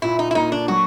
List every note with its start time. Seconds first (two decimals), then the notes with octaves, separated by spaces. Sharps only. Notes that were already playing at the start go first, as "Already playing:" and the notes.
0.02 A#2 E4
0.19 D#4
0.31 E4
0.35 A#3 D#4
0.52 D4
0.68 F#3 F#4